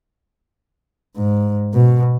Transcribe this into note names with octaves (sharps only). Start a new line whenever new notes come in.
G#2
B2